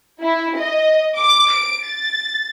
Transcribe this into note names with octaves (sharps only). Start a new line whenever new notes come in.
E4
D#5
D6
D7
A6